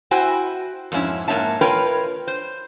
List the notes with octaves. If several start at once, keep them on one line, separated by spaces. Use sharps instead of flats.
E4 F#4 C5 G5 G#5
F2 G#2 C#4 E4
G#2 A#3 C4 C#5 E5 A5
F4 A#4 B4 C#5 G5
C5